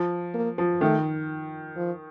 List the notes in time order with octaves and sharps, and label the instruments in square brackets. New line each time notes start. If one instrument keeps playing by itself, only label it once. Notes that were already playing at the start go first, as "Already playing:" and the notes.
Already playing: [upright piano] F3
[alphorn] A#3
[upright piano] F3
[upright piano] D#3 [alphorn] A3
[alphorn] F3